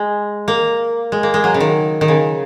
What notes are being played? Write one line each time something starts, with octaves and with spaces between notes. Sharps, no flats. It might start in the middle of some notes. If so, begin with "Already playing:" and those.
Already playing: G#3
A#3
G#3
A#3
G#3
F#3
C#3
D#3
D#3
C#3